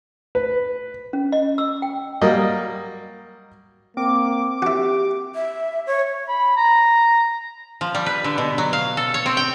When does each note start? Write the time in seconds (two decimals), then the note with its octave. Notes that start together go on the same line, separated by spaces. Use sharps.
0.35 B4
1.13 C#4
1.32 D#5
1.58 E6
1.82 G5
2.21 F#3 G3 A#3 D#5
3.97 A#3 C4 D6
4.62 E4 F#4 G4
5.35 E5
5.87 C#5
6.28 B5
6.57 A#5
7.81 F3
7.95 G3
8.06 B4
8.24 D3
8.38 B2
8.58 F#3
8.73 F5
8.97 A4
9.14 C#5
9.26 C4
9.37 G5